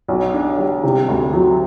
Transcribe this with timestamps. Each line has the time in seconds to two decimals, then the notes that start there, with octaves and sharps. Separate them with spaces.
0.08 B1
0.33 D4
0.58 G3
0.83 C3
1.08 D2
1.33 F#3